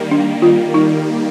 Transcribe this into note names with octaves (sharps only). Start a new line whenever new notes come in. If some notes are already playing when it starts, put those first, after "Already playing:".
Already playing: D#3 G3 A#3
D4
F4
D#4